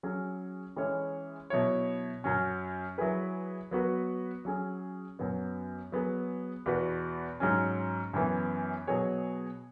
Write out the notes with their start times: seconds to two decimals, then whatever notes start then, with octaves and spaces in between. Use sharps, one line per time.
0.03 F#3 C#4 G#4
0.76 E3 G#3 C#4 G#4 C#5
1.50 B2 F#3 E4 C#5
2.24 F#2 F#3 C#4
2.98 F#3 E4 G#4 B4
3.71 F#3 B3 F#4 B4
4.45 F#3 C#4 G#4
5.19 F#2 F#3 B3
5.92 F#3 B3 G#4
6.66 E2 B2 B3 F#4 B4
7.40 G#2 F#3 C#4
8.13 F#2 E3 B3
8.87 B2 F#3 B3 G#4 C#5